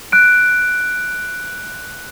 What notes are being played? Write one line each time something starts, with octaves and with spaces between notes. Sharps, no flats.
F#6 D7